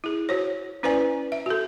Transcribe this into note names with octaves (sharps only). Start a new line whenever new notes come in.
E4 G#4
F#4 C5 C#5
C#4 E4 B4 C5 D5 G#5
E5
F#4 A4